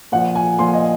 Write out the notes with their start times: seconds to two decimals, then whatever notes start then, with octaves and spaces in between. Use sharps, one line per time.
0.12 A#2 F3 F#5
0.35 G#5
0.59 A#2 F3 C6
0.74 D#5